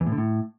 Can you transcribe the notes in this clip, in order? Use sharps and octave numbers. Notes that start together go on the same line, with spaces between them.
E2
A2
D3
A2